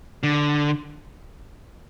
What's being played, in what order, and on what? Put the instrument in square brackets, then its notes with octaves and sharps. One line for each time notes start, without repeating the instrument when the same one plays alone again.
[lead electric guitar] D3